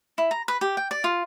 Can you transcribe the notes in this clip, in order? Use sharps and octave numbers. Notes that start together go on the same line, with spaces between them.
E4
A#5
B4
G4
G5
D5
F4